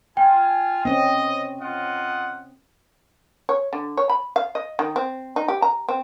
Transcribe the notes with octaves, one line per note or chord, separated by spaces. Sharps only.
F4 G5 G#5
C4 C#4 D#5
F4 D#5 F#5
C#5
D3
C#5
B5
F5
D#5
D#3
C4
D#4
G4
A#5
C4